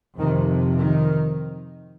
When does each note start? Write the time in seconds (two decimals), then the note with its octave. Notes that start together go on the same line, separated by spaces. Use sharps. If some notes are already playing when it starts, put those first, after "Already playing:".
0.18 F2 C3 D#3
0.79 D#3